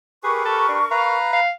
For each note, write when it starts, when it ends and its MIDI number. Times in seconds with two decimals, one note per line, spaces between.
0.24 0.79 67
0.24 0.41 68
0.24 1.16 70
0.24 0.79 71
0.24 1.16 85
0.45 0.67 69
0.68 0.84 62
0.91 1.40 71
0.91 1.31 77
0.91 1.40 82
1.33 1.50 77